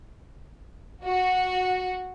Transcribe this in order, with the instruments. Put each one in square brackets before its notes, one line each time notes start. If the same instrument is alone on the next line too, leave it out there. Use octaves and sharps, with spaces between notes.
[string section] F#4